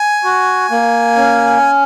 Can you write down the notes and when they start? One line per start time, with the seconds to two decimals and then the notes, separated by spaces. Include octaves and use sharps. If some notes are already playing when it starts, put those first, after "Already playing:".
Already playing: G#5
0.24 F#4
0.71 A#3
1.16 C#4